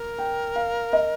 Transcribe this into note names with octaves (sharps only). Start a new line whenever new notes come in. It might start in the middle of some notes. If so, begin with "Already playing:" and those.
Already playing: A#4
G5
F5
D#5